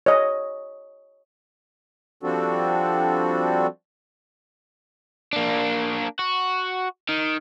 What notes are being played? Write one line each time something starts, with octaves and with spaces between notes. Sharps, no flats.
C#5 D#5
F3 G3 C4 D4 F#4 A4
A#3 D4
F#4
D#3